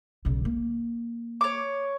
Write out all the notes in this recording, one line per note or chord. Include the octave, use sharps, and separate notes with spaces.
B1 C#3
A#3
C#5 D6